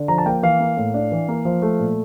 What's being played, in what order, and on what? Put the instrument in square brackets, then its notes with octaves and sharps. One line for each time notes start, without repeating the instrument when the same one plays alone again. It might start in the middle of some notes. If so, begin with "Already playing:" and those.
Already playing: [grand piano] D3
F3 A#5
A5
A#3 G5
E3 F5
A#3
A2
D4
E3
A#3
F3
A3
A#2